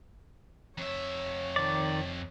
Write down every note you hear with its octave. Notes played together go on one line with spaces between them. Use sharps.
F2 C#5 E5
D#3 D5